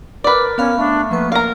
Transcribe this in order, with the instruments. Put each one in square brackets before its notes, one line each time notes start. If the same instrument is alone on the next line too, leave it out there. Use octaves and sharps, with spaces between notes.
[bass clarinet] A#4 [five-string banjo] B4 D5
[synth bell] B3 F5 B5 [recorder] C#4
[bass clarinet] A3 [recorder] D4
[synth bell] F3 A#3 C#6 [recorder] B3
[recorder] A#4 [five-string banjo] F5 A#5